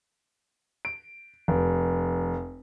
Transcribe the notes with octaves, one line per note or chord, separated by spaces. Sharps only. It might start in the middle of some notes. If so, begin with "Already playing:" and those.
D7
F1